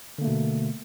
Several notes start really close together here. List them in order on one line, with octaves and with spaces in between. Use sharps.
D3 A#3 A3 B2